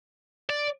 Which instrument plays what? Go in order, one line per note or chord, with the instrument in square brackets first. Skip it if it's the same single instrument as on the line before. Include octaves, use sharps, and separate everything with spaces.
[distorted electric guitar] D5